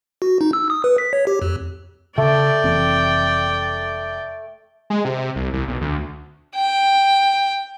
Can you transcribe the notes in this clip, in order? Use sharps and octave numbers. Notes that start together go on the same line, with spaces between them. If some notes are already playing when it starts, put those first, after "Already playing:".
F#4
D#4
E6
D#6
B4
B6
C#5
G4
F2
C#3 A3 D5 G5
F1 E3 C4
G#3
C3
C2
C2
B1
D2
G5